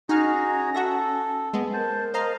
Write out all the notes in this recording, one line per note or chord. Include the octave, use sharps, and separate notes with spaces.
C#4 D#4 F#4 G#4 A#5 F6
F#4 A4 E5 A#6
G#3 B3
A#4 C5 A5
C5 D#5 F5 A#5